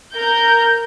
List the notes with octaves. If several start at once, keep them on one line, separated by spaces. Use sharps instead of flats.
A#4 G6